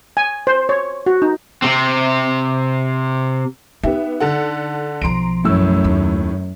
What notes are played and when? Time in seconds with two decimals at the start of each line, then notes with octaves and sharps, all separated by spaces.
0.17 G#5
0.47 C5
0.69 C#5
1.06 F#4
1.22 D#4
1.62 C3 C4
3.83 B3 D#4 G4 E5
4.20 D3 A4 F#5
5.02 B1 F3 A#5 C6 D7
5.45 F#2 A2 E6
5.84 D#2